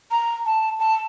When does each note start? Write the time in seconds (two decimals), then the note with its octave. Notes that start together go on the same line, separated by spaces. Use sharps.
0.11 A#5
0.46 A5
0.79 A5